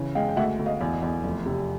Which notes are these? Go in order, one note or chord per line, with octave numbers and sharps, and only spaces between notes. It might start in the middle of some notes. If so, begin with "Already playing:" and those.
Already playing: C#3 E3
G#3 F5 G5
G5
D2 E5 F#5
D2
D#5 F5
E2
E2
F1
C3